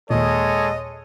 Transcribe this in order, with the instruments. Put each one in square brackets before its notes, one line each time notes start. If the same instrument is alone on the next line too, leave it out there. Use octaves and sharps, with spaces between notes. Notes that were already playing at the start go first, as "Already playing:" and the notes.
[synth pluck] D#2 A#2 [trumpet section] G#3 A4 C#5 [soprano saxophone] D#5